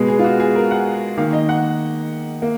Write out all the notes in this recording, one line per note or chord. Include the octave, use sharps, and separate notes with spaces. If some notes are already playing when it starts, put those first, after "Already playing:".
Already playing: B2 G#3 B3
G#4
F4
F#4
G#4
A#4
F#5
D#3 A#3 F5
D#5
F#5
A#3